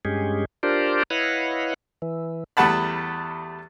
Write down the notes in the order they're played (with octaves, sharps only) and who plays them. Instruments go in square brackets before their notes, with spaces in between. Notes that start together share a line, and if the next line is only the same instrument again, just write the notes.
[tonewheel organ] G2 G#3 C#4 G4 G#4
D4 F4 G4 A#4 C5 D5
E4 B4 C#5 D#5 F5 F#5
E3
[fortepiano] E2 G3 A3 F#5 A5 B5